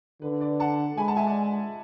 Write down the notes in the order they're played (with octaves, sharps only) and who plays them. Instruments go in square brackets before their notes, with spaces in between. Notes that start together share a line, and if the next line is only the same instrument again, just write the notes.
[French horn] D3 [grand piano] B4
[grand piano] B4 D5
F#5 A5
[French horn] G#3 [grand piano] G#5 B5
[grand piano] F#5 A5
E5 G#5
D5 F#5